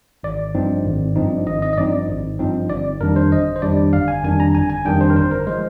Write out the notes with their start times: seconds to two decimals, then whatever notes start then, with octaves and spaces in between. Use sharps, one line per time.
0.23 G#1 D5
0.55 G2 F3 C4 D#4
0.85 G#1
1.16 G2 F3 C4 D#4
1.47 G#1 D#5
1.62 D#5
1.73 D#5
1.77 G2 F3 C4 D#4 D5
2.09 G#1
2.39 G2 F3 C4 D#4
2.69 G1 D5
3.00 F2 D#3 G3 D4 A#4
3.16 C5
3.32 G1 D#5
3.56 C5
3.62 F2 D#3 G3 D4 D5
3.93 G1 F5
4.08 G#5
4.24 F2 D#3 G3 D4 G#5
4.40 A#5
4.55 G1 G#5
4.70 G#5
4.85 F2 D#3 G3 D4 G5
5.01 C5
5.10 A#4
5.16 G1 C5
5.31 A#4
5.47 F3 G#3 C5